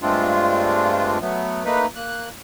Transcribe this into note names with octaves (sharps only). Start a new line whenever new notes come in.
G2 G#3 A3 C4 D4 F4
F#3 A3 B3
A3 A#3 D#4 B4
A#3 F#6